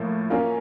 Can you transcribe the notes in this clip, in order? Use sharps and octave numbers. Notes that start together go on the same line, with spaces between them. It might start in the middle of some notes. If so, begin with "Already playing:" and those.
Already playing: A2 F3 A#3
F#3 A#3 C#4 F4